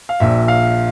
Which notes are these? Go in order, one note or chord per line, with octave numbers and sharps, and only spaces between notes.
F5
A#1 A#2 E5
F5